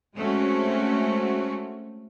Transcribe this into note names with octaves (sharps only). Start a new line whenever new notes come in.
G#3 A3 C4 C#4 F#4